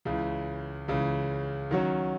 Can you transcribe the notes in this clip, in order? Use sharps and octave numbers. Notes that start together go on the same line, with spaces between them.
C#2 C#3 E3
C#2 C#3 E3
D#3 F#3 C#4 F#4 C#5